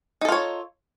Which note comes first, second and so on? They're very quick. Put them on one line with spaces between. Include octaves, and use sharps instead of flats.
D#4 A4 F4 C#5